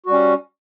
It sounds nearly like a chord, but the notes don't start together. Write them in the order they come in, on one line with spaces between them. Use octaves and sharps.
F#4 G3 C#4